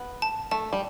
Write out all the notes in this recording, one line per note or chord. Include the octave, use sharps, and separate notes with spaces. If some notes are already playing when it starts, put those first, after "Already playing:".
Already playing: B3
A5
A3 A5
G3